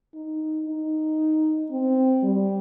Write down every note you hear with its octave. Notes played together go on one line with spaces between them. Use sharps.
D#4
D#4
C4
G3